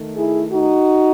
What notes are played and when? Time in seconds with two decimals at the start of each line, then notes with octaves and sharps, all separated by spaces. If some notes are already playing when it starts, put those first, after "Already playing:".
Already playing: D#3 A3
0.16 E4 G#4
0.52 D#4 F#4